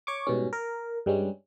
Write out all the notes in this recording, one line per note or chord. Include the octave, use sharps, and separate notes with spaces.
C#5 C#6 D6
G#2 B2 G3 C#4
A#4
G2 G3 G#3 C#4